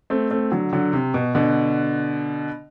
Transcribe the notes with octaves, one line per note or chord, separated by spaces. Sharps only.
A3 C4
A3 C4
D3 F#3
D3 F#3
C3
B2
B2 D3